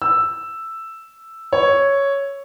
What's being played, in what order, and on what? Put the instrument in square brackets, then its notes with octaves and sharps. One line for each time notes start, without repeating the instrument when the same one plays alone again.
[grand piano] E6
C#5